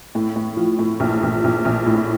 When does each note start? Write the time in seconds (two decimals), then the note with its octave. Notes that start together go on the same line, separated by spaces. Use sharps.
0.15 A2
0.36 A2
0.57 F3
0.79 A2
1.00 A#1
1.23 A#1
1.44 A#1
1.65 A#1
1.86 A2